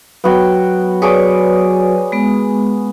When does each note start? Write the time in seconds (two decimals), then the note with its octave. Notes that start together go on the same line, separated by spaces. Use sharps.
0.24 F#3 B3 F#4 G5
1.02 G#4 B4 C#5 D5 C#6 D6
2.12 G#3 B3